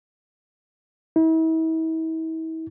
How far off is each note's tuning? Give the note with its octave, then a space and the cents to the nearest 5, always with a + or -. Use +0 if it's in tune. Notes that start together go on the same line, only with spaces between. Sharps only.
E4 -40